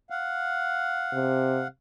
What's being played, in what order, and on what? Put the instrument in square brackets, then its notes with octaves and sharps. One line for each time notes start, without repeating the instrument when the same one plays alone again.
[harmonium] F5 F#5
[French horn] C3